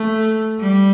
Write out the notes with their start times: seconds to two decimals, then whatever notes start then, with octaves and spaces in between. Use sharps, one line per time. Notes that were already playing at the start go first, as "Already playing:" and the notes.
Already playing: A3
0.59 G3